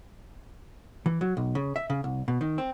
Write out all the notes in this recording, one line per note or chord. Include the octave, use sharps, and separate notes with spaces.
E3
F#3
B1
C#3
E5
C#3
C2
B2
D#3
C4